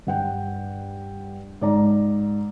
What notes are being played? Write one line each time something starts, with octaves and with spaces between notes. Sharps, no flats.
G2 F#5 G5
G#2 D5 A#5